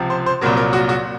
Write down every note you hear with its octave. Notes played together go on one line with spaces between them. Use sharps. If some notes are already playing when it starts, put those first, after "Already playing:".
Already playing: C#2 C3 F3
C5
C5
C2 A#2 F#3 A#4
A#4
F#4
F#4